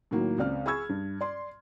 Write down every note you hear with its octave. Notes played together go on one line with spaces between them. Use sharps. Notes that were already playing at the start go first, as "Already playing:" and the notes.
A2 D#3 F#3 A#3
C#2 C4 D5 F6
G#4 B5 C#6 E6 G#6
G2
D5 C6